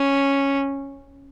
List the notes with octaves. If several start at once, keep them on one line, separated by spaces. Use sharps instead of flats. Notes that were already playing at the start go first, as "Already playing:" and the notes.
Already playing: C#4